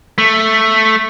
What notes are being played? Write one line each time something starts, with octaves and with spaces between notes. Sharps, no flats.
A3